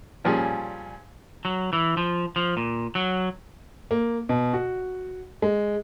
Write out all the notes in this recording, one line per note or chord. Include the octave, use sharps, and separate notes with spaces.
A#2 F3 G3 C#4 G#4
F#3
E3
F3
F3
A#2
F#3
A#3
B2
F#4
G#3